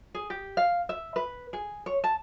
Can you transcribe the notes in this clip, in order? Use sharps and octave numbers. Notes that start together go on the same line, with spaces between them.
G#4
G4
F5
E5
B4
G#4
C#5
A5